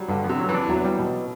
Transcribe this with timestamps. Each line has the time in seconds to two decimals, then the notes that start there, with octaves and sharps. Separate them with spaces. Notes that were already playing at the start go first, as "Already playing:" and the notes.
Already playing: F#3 G3
0.09 G2 D3
0.24 B3
0.29 C3
0.40 F#3
0.49 E3
0.54 D4
0.69 E2 F#3
0.85 G3
0.99 B2